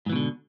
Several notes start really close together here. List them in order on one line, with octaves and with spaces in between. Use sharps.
G#2 E3 B2 D3